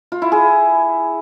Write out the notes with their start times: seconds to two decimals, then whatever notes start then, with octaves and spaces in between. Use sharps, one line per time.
0.12 F4
0.22 E4
0.32 G#4